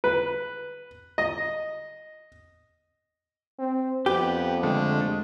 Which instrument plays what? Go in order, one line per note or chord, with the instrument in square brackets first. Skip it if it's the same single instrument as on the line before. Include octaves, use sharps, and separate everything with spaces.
[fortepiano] B4
D#5
[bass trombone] C4
[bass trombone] F2 [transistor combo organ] B3 [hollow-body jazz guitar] G4
[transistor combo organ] D3 A3 [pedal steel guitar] G#3